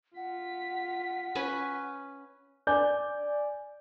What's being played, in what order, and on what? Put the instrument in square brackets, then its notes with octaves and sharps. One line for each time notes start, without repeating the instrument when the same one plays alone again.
[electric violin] F4 B6 [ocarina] F#5
[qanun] C#4 B4 G#5
[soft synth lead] D5 [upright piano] G#5 G6